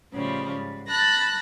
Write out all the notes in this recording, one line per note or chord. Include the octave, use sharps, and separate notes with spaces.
A2 C#3 F3 G3
G#2
A5 B5 F#6 A6 A#6